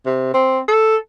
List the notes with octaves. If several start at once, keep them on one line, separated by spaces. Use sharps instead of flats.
C3
C4
A4